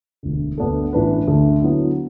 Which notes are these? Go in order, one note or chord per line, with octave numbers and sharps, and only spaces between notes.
E1 D2 D3
D2 D3 B3 D4 A4
A1 A2 E3 D4 B4
D2 D3 A3
D3 F#3 B3 E4